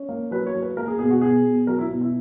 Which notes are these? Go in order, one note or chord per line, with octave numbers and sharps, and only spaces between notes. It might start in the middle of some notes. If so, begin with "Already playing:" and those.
Already playing: C#4
A#3
F#3 B4
C#5
F#3
B4
A#3 A#4
G#4
B2 G#4
F#4
B2 G#4
B2
F#3 A#4
E4
B2
E4